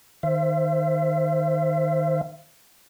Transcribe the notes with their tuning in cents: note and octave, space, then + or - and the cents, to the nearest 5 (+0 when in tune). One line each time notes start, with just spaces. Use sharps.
D#3 +0 C5 +0 E5 +35